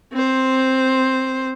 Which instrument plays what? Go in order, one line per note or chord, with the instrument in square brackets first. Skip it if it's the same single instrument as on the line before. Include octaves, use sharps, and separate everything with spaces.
[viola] C4 C5